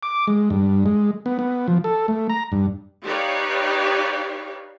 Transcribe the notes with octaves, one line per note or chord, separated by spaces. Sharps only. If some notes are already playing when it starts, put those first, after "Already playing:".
D6
G#3
G2
G#3
B3
B3
F3
A4
A3
A#5
G2
D#4 G4 B4 C#5 D5 F5